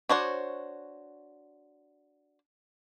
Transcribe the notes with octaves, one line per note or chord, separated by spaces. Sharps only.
D4 F#4 C5 C#5